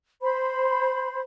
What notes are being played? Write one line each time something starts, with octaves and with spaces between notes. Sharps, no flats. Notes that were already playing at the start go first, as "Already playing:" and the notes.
C5 B5